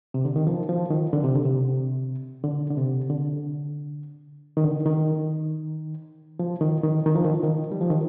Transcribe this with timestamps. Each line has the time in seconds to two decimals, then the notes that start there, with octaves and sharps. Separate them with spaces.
0.14 C3
0.25 D3
0.36 D#3
0.47 F3
0.69 F3
0.90 D#3
1.13 D3
1.24 C3
1.35 D3
1.45 C3
2.44 D3
2.70 D3
2.77 C3
3.10 D3
4.57 D#3
4.64 D3
4.86 D#3
6.39 F3
6.61 D#3
6.84 D#3
7.06 D#3
7.15 F3
7.24 D#3
7.34 F3
7.43 D#3
7.72 G3
7.81 F3
7.90 D#3